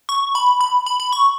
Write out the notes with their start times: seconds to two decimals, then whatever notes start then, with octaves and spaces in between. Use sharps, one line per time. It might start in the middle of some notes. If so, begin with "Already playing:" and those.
0.09 C#6
0.35 B5
0.61 B5
0.86 B5
1.00 B5
1.12 C#6